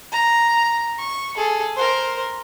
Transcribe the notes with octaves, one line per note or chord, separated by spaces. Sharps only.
A#5
C#6
G#4 A4
A#4 C5